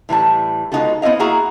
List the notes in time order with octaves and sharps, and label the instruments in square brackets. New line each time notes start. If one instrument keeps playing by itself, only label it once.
[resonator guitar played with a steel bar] A2 E3 G3 A5
G#3 B3 D#4 F4 F#4 A4
B3 C4 E4 D#5 F5
A#3 E4 F#4 G#4 A#5